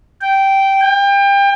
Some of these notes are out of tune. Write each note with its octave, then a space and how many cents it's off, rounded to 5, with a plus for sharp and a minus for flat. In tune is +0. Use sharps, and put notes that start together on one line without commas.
G5 -10
G5 +30